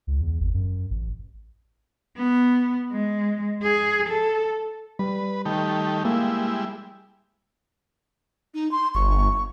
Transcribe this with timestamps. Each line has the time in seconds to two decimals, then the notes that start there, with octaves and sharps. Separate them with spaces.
0.07 C#2
0.21 E2
0.40 G#1
0.54 F#2
0.90 A1
2.17 B3
2.93 G#3
3.63 G#4
4.09 A4
4.99 G3 B4
5.45 D#3 A3 G4
6.05 G3 G#3 A#3 E4
8.54 D#4
8.71 C6
8.95 G1 C#6